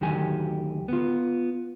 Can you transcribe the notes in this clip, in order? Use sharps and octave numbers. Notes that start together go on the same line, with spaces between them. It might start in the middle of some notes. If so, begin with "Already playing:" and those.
D2 D#3 F#3 G4 G#5
B3 F4